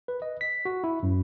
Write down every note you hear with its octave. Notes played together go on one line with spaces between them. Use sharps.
B4
D#5
B6
F#4
E4
F#2